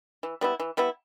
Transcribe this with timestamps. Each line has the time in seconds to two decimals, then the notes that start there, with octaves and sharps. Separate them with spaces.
0.23 E3
0.41 G3 B3 E4
0.60 E3
0.77 G3 B3 E4